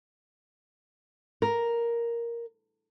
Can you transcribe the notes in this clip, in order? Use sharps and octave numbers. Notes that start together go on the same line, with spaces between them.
A#4